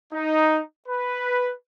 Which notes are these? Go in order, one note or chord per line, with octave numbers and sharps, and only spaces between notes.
D#4
B4